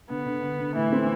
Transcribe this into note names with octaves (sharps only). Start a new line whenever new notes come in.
D3 B3
D3
D3
D3
A2 E3
C4